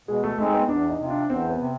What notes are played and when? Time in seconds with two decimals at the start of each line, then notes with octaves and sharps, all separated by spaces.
0.08 B2 G#3
0.24 A3
0.38 G#3 A3 C4 D#4
0.54 B3
0.69 E2 D4
0.89 D#4
0.99 C3 F3
1.10 D4
1.30 E2 C4
1.50 B3
1.60 C3